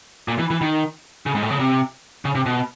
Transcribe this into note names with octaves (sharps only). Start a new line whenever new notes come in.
A#2
E3
E3
D#3
C#3
G#2
A2
C#3
C3
C#3
C3
B2